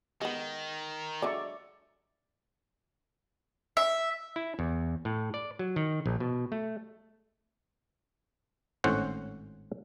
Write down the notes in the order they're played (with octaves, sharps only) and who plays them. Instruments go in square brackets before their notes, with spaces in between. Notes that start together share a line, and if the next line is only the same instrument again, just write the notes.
[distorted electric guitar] D#3 [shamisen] G#3 B3
[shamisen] D3 F#3 G#3 [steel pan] D5 E5 C#6
[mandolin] E5
[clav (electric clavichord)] E4
E2
A2
D5
F#3
D#3
A#1
B2
A3
G#1 A2 C#4 C5 F#5